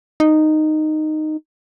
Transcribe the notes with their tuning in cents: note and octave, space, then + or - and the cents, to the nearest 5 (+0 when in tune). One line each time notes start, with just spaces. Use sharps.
D#4 -10